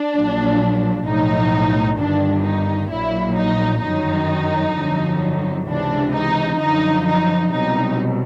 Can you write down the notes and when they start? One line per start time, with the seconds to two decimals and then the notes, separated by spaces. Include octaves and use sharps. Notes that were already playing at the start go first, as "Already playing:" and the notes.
Already playing: D4
0.13 A#1 A#2 F#3
1.05 B1 A2 F3 D#4
1.98 G1 G2 D#3 D4
2.45 D#4
2.90 A#1 A#2 F#3 E4
3.37 D#4
3.83 G1 F#2 D#3 F#3 D#4
4.75 G1 F2 D3 F#3
5.68 C#2 C3 E3 D4
6.14 D#4
6.61 F#2 D3 F3 D#4
7.07 D#4
7.53 C2 B2 F#3 D#4